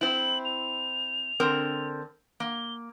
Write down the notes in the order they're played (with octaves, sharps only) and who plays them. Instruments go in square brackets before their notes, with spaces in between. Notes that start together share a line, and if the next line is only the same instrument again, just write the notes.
[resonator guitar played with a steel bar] C4 E4 [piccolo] F#7
[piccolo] F7
[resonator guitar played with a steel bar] D3 C4 A#4
[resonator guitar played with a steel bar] A#3 [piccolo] G7